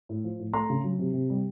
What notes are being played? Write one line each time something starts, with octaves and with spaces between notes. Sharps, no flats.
A2
F3
A2
A3 A#5 C6
C#3
F#3
C3
C3
G3